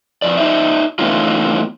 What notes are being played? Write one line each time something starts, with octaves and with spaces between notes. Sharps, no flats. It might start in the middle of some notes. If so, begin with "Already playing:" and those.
F2 D5
D#4 F#4 C5 D5 E5
E3 A3 B3 C#4 D#4 F4